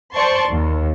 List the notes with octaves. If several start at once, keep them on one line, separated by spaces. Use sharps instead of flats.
C5 D5 A5 C6 C#6
D#2